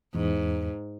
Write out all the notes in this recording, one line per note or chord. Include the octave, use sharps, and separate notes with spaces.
E2 G#2